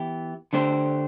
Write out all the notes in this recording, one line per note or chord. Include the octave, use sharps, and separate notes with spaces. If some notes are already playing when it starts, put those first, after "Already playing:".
Already playing: E3 B3 E4 G4
D3 A3 D4 G4 C5